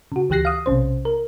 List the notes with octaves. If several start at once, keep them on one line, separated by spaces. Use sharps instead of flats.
C#3 F#4
D2 E3 G4 F#6 A#6 C7
F5 D#6
B1 C3 C#4 C5
A#4